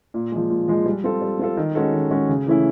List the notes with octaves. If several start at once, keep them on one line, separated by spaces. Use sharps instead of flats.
A#2
F3 G#3
A#2
F3 G#3
G3
C4 F4 A4
G3
C4 F4 A4
D#3
G#3 C#4 F#4 A4
D#3
G#3 C#4 F#4 A4
C#3
E3 A3 C#4 E4